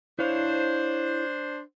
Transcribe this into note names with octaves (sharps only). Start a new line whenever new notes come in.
D4 E4 C5 C#5 F5